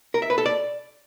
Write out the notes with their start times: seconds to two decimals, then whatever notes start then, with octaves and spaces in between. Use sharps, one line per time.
0.14 A#4
0.22 E5
0.30 B4
0.38 A4
0.46 D5